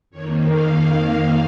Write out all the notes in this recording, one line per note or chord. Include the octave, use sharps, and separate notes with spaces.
F2 D#3 A#3 C#5
F5